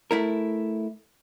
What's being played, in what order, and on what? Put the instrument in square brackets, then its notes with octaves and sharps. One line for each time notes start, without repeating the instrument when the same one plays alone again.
[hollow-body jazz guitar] A3 E4 A#4